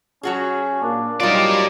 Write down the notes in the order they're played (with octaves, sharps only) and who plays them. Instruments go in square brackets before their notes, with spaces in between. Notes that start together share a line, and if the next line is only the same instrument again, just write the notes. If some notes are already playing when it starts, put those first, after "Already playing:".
[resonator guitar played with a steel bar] F#3 F#4 G#4 [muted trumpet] C#4
[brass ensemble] A#2 A#3 [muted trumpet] D4
[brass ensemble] F#3 G3 [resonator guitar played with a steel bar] D#4 F4 [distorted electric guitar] A#4 D5